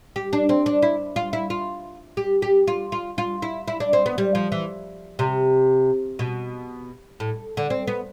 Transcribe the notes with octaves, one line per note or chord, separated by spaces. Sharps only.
G4
D4
C4
D4
E4
F4
E4
F4
G4
G4
F4
F4
F4
E4
E4
D4
C4
B3
G3
F3
E3
C3
B2
A2
D3
C4
B3